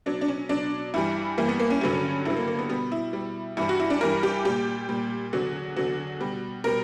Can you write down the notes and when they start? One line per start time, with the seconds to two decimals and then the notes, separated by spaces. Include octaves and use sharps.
0.06 B2 F#3 D4
0.21 D4
0.28 C#4
0.49 B2 F#3 D4
0.94 G2 E3 G3 E4
1.38 G2 E3 G3 A#3
1.49 B3
1.60 A#3
1.70 C#4
1.81 G2 D3 F#3
2.25 G2 D3 F#3 E4
2.37 A#3
2.47 A#3
2.59 B3
2.69 B2 G3 B3
2.92 E4
3.13 B2 G3
3.57 G2 E3 G3 E4
3.69 F#4
3.80 E4
3.90 D4
4.01 G2 E3 G3 A#4
4.23 G4
4.45 A#2 G3 G4
4.89 A#2 G3
5.33 E2 D3 F#3 F#4
5.76 E2 D3 F#3 F#4
6.21 B2 G3
6.64 B2 G3 A#4